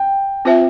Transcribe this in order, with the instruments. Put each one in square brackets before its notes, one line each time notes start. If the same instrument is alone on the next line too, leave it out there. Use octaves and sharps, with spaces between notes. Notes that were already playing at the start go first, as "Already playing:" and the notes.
Already playing: [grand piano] G5
[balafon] C4 F4 C5 E5